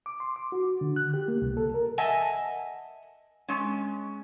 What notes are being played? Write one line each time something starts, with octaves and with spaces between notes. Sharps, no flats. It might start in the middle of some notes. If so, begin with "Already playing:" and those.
D6
C6
D6
F#4
D3
F#6
G4
A#3
C2
A4
A#4
D#5 E5 F#5 G#5 A5
G#3 C#4